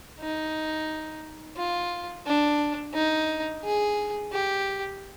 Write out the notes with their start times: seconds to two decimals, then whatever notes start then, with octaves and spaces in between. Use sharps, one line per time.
0.20 D#4
1.57 F4
2.26 D4
2.94 D#4
3.64 G#4
4.33 G4